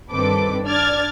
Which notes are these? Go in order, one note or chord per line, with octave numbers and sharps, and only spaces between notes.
G2 D#3 C4 A4 B4 D6
D4 D5 F6 G#6 A6